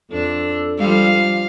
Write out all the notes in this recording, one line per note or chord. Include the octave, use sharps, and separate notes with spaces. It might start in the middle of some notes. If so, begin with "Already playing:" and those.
F2 D4 A4
F3 G3 F5